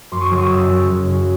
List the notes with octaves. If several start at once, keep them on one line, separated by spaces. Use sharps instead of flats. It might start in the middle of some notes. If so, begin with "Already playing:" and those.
F#2 C6 D6
C#6 D#6
C#3 F#3 C6 D6
C#6 D#6
F#2 D6 E6
C#3 F#3
F#2
C#3 F#3